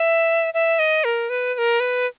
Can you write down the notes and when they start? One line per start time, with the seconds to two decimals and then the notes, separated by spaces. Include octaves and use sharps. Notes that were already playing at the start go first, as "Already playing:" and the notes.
Already playing: E5
0.54 E5
0.79 D#5
1.04 A#4
1.30 B4
1.54 B4
1.58 A#4
1.80 B4